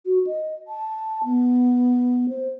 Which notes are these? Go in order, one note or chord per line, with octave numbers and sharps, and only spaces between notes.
F#4
D#5
A5
B3
C5